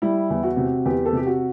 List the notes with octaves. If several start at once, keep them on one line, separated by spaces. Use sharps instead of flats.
G3 E4
E2
F#4
C3
E2 G4
A4
C3 G4
F#4